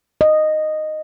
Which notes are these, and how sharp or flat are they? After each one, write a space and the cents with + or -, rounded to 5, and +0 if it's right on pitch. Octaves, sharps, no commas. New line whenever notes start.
D#5 -10